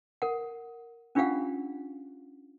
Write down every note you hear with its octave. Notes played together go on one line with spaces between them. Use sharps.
A#4 F#5
C#4 D4 F4 G4 F5 F#5